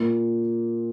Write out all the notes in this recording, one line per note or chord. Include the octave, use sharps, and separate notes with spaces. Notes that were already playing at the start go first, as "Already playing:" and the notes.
Already playing: A#2 A#3